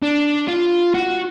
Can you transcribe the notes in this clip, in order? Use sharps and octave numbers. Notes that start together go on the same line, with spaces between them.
D4
F4
F#4